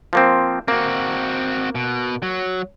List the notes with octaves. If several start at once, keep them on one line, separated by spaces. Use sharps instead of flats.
F3 A#3 C4
A#3 C4 F#4
B2
F#3